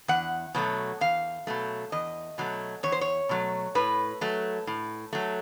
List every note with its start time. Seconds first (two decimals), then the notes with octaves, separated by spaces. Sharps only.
0.08 E2 F#5
0.55 B2 F#3 A3
1.01 E2 F5
1.47 B2 F#3 A3
1.92 E2 D#5
2.38 B2 F#3 A3
2.83 E2 C#5
2.92 C5
3.01 C#5
3.29 B2 F#3 A3
3.75 A2 B4
4.21 F#3 A3
4.67 A2
5.13 F#3 A3